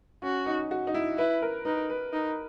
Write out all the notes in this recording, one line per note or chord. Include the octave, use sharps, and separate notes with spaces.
C#4 F#4
D#4
F#4
D#4
E4
E4 B4
A#4
D#4 B4
B4
D#4